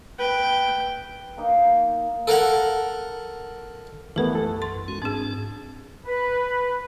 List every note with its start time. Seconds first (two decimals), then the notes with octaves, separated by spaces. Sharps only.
0.19 B4 G5
1.37 A#3 D#4
2.28 A4 A#4 F5 F#5
4.16 B1 F#2 E3 A3 B3 G4 A#4
4.35 A4
4.62 C6 A6
4.88 G#3 C#4 F#4
5.02 G#2 C4 D4 G#4
6.06 B4